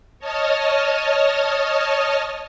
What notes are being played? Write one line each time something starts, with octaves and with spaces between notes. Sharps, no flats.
C#5 D#5 A5 D#6 F6